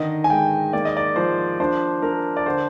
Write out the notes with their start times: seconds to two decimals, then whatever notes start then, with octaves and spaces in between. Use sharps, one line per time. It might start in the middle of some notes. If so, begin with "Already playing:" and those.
Already playing: D3 D#3 D#5
0.24 G#5
0.30 G#3 G5
0.73 A#3 D5
0.85 D#5
0.97 D5
1.16 F3 C5
1.60 D4 C5
2.02 D4 A#4
2.37 D5
2.46 D3 C5